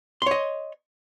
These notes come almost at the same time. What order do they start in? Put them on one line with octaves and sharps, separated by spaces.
C6 C#5 D#5